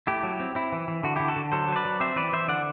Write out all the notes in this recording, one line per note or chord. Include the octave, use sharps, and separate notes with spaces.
A3 E4 G4
F#3
C4
C4 E4
E3
E3
D3 F#4
D3 E4 G4
F#4 A4
D3
F#3 A4 C5
F#3 C5
B4 D5
F#3
C4 C5 E5
E3 B4 D5
E3 C5 E5
D3 D5 F#5